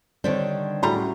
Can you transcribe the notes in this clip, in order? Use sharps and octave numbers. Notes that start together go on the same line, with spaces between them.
D3 D#3 G3 C4 D4 C5 C#5
A2 G3 F#4 G#4 A4 A#5 C6
C#4